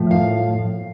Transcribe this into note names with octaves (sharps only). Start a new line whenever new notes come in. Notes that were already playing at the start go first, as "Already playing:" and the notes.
Already playing: A2 F3 A3
F5